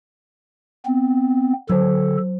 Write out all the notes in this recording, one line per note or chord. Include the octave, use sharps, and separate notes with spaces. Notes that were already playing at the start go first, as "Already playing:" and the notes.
B3 C4
D3 F#3 A4 C5